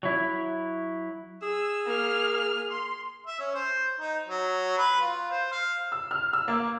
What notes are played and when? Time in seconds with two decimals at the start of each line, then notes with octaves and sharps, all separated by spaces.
0.03 F#3 E4
1.42 G#4 E6
1.86 A#3 F6
2.71 C6
3.26 E5
3.39 C#4
3.55 C5
4.00 D#4
4.28 F#3
4.78 B4
5.01 F4
5.31 C5
5.52 F5
5.92 E6
6.11 F6
6.33 E6
6.48 A#3